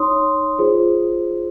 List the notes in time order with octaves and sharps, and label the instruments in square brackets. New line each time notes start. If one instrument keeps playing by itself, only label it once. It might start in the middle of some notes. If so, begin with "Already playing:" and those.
Already playing: [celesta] D#4 C#5 C6 D#6
F4 G#4 C5